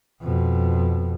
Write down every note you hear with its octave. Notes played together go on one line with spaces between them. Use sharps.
F2 B2